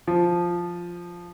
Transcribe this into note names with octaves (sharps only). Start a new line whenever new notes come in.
F3